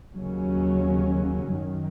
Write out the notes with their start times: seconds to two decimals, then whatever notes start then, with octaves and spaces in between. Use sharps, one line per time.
0.15 D#2 C#3 F#3 C#4
1.50 F#2 D#3 F#3